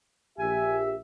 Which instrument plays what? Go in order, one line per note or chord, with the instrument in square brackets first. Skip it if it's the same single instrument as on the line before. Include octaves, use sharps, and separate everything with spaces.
[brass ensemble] A#1 E5 [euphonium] G4 [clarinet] G#5